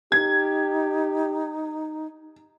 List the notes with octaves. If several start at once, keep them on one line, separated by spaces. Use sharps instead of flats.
D#4 G4 G#6